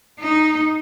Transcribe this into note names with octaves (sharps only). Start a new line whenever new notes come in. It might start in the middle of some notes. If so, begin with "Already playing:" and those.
D#4